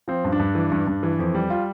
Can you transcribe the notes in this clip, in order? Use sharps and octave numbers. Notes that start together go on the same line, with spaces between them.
F3 C4
G2
D4
G2
E3
G2
G2
E3
F2
G3
F4